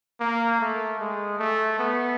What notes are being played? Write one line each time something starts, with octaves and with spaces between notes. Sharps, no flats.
A#3
A3
G#3
A3
B3